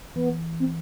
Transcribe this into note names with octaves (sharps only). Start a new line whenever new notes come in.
E3 B3
C4